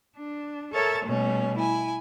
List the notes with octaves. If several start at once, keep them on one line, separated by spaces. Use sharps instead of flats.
D4
A4 A#4 C#5 E5 A6
B2 G3 A3 C#4
E4 G#5